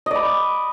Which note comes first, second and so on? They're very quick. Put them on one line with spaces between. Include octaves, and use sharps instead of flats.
D#5 D5 B5